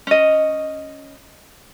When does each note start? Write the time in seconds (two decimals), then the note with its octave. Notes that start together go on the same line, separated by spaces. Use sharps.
0.07 C#4 D#5